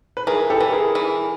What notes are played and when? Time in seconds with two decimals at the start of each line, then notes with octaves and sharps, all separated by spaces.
0.17 B4
0.27 E3 G#4 A#4
0.50 G4 A4
0.60 E3
0.72 G#4 A#4
0.95 E3